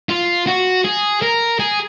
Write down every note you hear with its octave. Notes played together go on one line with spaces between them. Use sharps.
F4
F#4
G#4
A#4
G#4